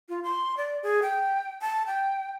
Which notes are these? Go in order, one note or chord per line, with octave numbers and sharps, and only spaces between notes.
F4
C6
D5
G#4
G5
A5
G5